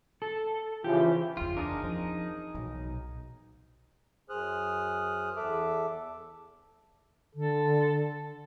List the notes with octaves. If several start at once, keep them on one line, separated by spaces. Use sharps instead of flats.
A4
C#3 E3 F3 G4
F#1 E2 F4
D4 D#4 G#4 A#4
F3 C4
B1 A#2 E3
F#2 G#4 C5 D#6 F6 F#6
E2 A4 E5 D6
D3 A4